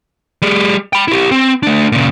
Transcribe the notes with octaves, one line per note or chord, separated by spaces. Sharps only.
G3 G#4
G5 B5
E4 G4
C4
A3 D4
A#2 C#3